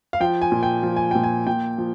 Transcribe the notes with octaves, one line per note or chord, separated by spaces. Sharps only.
F5
F3 G5
G#5
A#2
G5
F3
G#5
A#2 G5
G#5
A#2 G5
F3